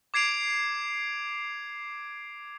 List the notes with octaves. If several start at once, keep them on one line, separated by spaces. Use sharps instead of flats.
D6 G#6 C7 D7 F7